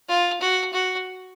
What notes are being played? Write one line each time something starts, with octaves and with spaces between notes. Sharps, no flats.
F4
F#4
F#4